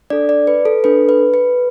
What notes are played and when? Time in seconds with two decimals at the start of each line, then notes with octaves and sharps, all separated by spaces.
0.10 D4 A4 D5
0.29 D5
0.47 B4
0.65 A4
0.84 D4 A4 B4
1.09 B4
1.34 B4